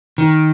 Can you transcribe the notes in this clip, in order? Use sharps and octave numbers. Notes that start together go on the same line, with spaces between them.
D#3